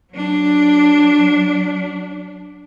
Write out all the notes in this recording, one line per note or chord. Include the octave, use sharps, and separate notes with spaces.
F#3 D4